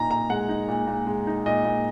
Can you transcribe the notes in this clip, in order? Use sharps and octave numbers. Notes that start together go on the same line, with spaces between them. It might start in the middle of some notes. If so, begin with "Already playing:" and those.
Already playing: A#2 D#4 A#5
A#2 A#5
G#3 F#5
D#4
A#2
A#2
G#3
D#4
A#2 D#5
A#2